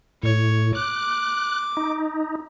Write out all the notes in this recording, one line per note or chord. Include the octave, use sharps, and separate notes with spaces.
A2 C#5
D6 F#6
D#4